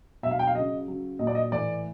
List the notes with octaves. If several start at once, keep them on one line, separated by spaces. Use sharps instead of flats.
B2 F#3 E5
F5
G5
F5
C#3 F#3 D#5
C#3 F#3
A#2 F#3 D#5
D5
D#5
A2 E3 D5